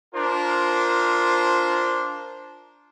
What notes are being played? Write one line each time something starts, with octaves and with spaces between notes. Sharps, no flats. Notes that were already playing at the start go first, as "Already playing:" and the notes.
D4 F4 A#4 C5